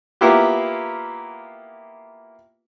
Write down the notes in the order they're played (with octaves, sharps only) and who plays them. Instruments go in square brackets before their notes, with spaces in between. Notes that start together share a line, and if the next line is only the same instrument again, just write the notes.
[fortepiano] A#3 B3 E4 F4 G4